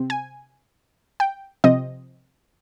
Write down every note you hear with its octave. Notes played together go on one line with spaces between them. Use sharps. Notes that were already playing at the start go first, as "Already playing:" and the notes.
Already playing: C3 C4
G#5
G5
C3 F3 C4 D#5